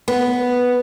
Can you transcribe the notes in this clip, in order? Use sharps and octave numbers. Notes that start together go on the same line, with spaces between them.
B3